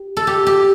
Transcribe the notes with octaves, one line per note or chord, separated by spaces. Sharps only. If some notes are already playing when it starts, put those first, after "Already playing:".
Already playing: G4
A4
G4
G4